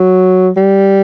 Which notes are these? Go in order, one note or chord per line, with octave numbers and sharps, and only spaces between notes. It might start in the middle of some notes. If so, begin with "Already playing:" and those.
Already playing: F#3
G3